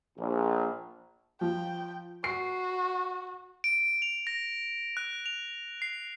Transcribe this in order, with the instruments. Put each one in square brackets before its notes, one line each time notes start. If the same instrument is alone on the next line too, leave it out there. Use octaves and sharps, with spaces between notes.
[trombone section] A#1
[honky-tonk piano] F3 [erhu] G5
[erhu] F#4 [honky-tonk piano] C7
[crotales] D7
F7
A#6
F#6
F7
C7